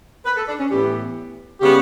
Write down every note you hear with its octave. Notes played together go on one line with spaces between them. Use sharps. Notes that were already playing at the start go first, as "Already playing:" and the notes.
B4
A4
D4
C#4
A2 E3 B3 G4
C#3 G3 B3 G4